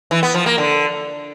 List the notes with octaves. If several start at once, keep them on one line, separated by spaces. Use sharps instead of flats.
E3
B3
F3
A#3
D3